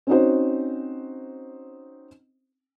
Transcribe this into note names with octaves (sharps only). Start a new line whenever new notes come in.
C4 C#4 D#4 F#4 C5